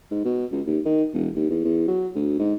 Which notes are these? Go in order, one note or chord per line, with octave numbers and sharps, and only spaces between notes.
G#2
B2
C#2
D#2
D#3
E1
D#2
E2
E2
F#3
D2
G#2